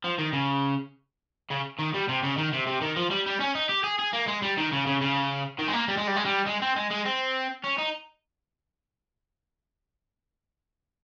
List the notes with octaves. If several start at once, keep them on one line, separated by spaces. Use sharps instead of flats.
F3
D#3
C#3
C#3
D#3
G3
C3
C#3
D#3
C3
C3
D#3
F3
G3
G3
C#4
D#4
G4
G#4
G#4
A#3
G#3
G3
D#3
C#3
C#3
C#3
D#3
G#3
A#3
G3
G#3
G3
G#3
G3
G#3
C4
G#3
G#3
C4
C#4
D#4